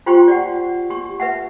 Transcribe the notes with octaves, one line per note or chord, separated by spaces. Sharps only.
F4 G4 C5 G5 C6 C#6
D5 F#5
G4 C#6
B4 E5 F#5